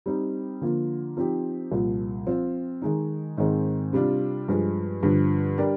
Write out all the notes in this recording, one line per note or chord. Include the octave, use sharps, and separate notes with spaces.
G3 C4 D#4
D3 F3 A#3 F4
F3 C4 D#4 G4
C2 A#2 F3
F3 C4 F4
D#3 G#3 D#4
G#2 D#3 G#3 C4
C3 G3 D4 F4
G2 F3 G#3
G2 D3 F3
G3 D4 G4 A#4 D5